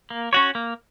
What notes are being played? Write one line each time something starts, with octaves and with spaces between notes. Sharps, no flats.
A#3
C#4 F#4 C#5
A#3